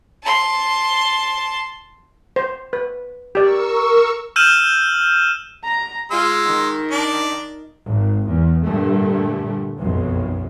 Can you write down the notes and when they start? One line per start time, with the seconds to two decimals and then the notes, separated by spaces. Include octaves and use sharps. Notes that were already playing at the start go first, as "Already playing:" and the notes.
0.23 A5 C6
2.36 C5
2.73 B4
3.35 G4 A#4 D5 C#6 E6
4.36 E6 F6 G6 D#7 E7 F#7
5.63 A#5
6.11 G#3 F4 C6 E6
6.45 D#3
6.91 D4
7.86 G#1
8.27 E2
8.63 G2 A#2 D3 A3
9.78 F1 B1 F#2